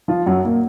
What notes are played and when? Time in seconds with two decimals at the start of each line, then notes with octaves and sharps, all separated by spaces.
0.08 F3 F4
0.26 F#2 F#3
0.45 A#2 A#3